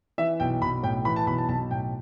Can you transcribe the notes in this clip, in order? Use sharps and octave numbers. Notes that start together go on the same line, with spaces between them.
E3 E5
B1 G5
B1 B5
A2 G5
E3 B5
A5
B1 B5
A5
B1 A5
A2 G5